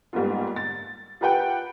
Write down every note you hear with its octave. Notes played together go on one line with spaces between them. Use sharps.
G#2 G3 A#3 B3 F4
A6
F4 G4 B4 F#5 G5